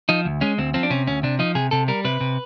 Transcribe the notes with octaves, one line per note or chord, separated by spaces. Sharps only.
F3 D#4
D2
G#3 C#4
D2 C4
F3 C4
D4
C3 C#4
D2 C#4
C3 D4
F3 D#4
C3 G#4
C3 A4
G3 A#4
C3 B4
C3